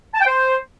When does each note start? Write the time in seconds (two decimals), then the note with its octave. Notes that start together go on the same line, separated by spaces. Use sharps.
0.14 A5
0.20 G5
0.26 C5